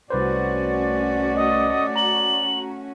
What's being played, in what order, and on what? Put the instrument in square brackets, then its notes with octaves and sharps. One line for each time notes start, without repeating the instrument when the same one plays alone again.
[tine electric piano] C2 B4 C5 [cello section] A3 C#4 F#4 [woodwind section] D5
[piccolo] D#5
[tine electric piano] A#5 [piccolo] F#7